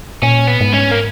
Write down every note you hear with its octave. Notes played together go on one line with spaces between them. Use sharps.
A#2 C#4
B3
G#2
C#4
A#3